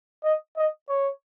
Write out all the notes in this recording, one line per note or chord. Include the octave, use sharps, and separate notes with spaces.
D#5
D#5
C#5